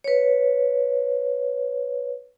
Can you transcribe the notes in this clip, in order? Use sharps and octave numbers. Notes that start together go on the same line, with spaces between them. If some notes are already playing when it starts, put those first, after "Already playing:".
B4 C#5